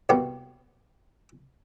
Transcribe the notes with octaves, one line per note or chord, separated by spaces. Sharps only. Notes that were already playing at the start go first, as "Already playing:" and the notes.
C2 B2 A#3 B3 G4